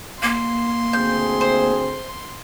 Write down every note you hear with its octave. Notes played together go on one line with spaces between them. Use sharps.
A#3 C6
D2 C4 G#4 G6
C5